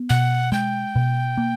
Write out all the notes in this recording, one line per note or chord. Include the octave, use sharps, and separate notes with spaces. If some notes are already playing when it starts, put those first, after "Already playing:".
Already playing: B3
B2 F#5
G#3 G5
B2
A#3